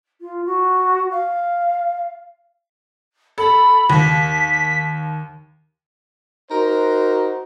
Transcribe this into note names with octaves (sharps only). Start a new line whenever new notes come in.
F4
F#4
F5
A4 B5
D#2 B6
D#4 F#4 A#4 C5